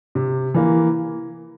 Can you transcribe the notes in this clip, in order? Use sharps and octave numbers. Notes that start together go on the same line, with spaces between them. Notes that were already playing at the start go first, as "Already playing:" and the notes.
C3
E3 A#3